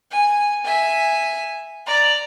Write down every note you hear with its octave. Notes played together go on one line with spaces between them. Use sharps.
G#5
E5 G#5
D5 A#5